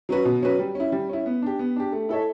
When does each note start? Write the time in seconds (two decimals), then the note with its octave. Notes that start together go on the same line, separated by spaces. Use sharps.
0.09 F#3 C#4 F#4 B4
0.25 B2
0.43 F#3 C#4 F#4 B4
0.59 G3
0.75 C#4 E4
0.92 G3
1.09 C#4 E4
1.26 B3
1.42 D4 G4
1.59 B3
1.76 D4 G4
1.92 A3
2.09 E4 A4 C#5 E5